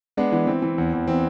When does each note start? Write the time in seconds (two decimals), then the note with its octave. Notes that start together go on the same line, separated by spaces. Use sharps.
0.17 G#3 B3 D4
0.32 E3 B3
0.47 E3 C4
0.62 E3
0.78 E2
0.93 E2
1.07 E3 C4